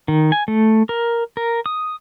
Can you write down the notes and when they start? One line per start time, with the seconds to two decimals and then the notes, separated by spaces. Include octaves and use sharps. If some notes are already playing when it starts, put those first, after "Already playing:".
0.08 D#3
0.32 G#5
0.48 A3
0.89 A#4
1.37 A#4
1.66 D#6